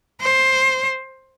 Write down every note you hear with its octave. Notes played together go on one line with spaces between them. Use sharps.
C5